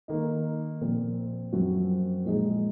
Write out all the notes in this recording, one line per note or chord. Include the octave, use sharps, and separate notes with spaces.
D#3 A#3 D#4
A#2 F3 C4
F#2 F3 C4 F#4
A#2 F3 G#3 D#4 G#4